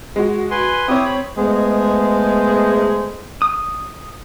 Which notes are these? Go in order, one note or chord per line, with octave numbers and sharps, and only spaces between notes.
G#3 F#4
B4 G#5 C6
C4 E4 G4 C#5 D#6
B5
G#3 A3 B3 G#4 C5 D#5
D#6